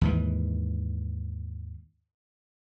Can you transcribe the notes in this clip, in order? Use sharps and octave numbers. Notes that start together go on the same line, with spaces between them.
D#2 G#2 E3